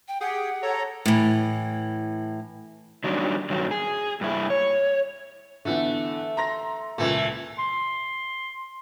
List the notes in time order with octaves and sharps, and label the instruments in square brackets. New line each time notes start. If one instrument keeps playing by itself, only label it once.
[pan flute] G5
[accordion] G4 G5 [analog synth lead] G#4 [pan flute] F#5
[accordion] A4 A#5 [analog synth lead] C#5
[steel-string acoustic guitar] A2 E3
[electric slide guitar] D#3 F#3 G3 D4
G2 D#3 F#3
G#4
G2 E4
C#5
[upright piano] D3 E3 B3 [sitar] A3
[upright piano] A#5 C6 A#6
[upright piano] C#2 A#2 [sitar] E3 A3
[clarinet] C6